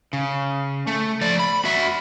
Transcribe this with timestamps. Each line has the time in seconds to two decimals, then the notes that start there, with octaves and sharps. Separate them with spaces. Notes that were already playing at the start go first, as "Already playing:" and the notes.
0.13 C#3
0.87 A3
1.21 F3 D5
1.40 B5
1.65 F#4 E5